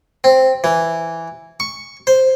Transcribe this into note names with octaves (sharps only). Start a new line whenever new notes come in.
C4
E3
C#6
C5